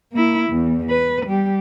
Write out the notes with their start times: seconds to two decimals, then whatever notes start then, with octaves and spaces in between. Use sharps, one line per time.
0.12 A#3 E4
0.50 E2
0.89 B4
1.26 G3 G4